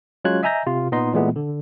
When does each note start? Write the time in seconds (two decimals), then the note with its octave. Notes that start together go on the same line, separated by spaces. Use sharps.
0.25 F#3 G#3 C#4 F4 F#6 G#6
0.43 D#5 E5 G#5 A#5 G6 A#6
0.66 C3 F4
0.92 A#2 B3 D#4 D#5 C6
1.14 A#2 E3 G#3 A3 B3
1.36 D3